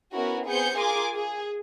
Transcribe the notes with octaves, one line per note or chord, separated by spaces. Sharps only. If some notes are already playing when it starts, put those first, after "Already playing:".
B3 C#4 E4 F#4 A#4
B3 C4 G#4 C5 G6 C#7
F4 G#4 A#4 G#5 C6 D6
G#4